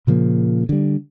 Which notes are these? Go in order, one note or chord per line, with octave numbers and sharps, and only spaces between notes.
A#2 C#3 F3 A#3
D3 G3